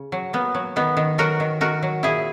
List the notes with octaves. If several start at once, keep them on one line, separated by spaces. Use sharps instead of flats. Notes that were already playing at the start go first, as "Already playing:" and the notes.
Already playing: C#3
F#3
A#3 B3
F#3
D#3 B3
D#3
F#3 F#4 A#4
D#3
D#3 F#4 A#4
F#3
A#2 E4 G#4